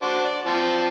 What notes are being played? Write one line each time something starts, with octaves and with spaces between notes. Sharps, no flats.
D4 F#4 C5
D5
F3 C4 A5